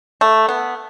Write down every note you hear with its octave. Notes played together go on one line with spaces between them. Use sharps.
A3
B3